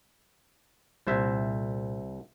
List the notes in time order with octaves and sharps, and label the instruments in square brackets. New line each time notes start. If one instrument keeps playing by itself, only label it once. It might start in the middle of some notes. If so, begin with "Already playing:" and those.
[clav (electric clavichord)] C2 C5 E5 [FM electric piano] A#2